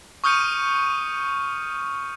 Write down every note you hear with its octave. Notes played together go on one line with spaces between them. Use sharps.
C#6 D#6 F6 G6 C#7 D#7